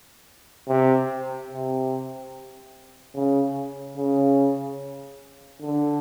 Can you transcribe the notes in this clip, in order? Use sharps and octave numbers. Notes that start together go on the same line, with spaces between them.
C3
C3
C#3
C#3
D3